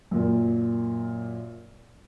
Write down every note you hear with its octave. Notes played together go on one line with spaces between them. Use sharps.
F#2 A#2 A#3